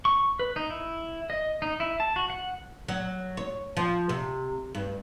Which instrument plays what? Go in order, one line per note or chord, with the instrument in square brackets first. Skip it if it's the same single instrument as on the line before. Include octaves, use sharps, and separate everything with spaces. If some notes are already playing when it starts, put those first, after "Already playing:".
[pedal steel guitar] C#6
B4
D#4
E4
D#5
D#4
E4
A5
F#4
F#5
[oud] F#3
C#5
F3
C3
G2